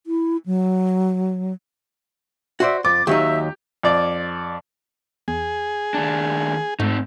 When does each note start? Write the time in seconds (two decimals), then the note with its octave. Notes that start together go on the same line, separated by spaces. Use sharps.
0.07 E4
0.46 F#3
2.60 F#4 C5 D5 E5
2.85 F2 D6 A6
3.07 D#2 F#3 D#4 G4 E5
3.83 F2 D5
5.28 E2 G#4
5.94 D#2 D4
6.80 G#2 A3 C4 D#4